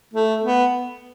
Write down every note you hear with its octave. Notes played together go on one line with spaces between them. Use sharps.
A3
B3